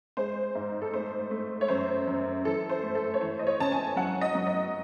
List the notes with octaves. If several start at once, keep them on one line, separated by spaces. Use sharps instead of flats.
G#3 C5
G#2
A4
A3 C5
A3
C#5
F#2 C5
F#2
E3 A4
C5
A3
A4
C#5
E3 C5
D#5
C#5
C#3 A5
G#5
F#3 F#5
D#5
F#3
D#5